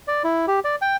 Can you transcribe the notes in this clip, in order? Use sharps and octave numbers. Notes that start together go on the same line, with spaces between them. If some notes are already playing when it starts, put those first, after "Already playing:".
D5
E4
G4
D5
G5